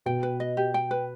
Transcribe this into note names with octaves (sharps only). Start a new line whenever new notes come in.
B2 G5
B4
D#5
G4
G5
B4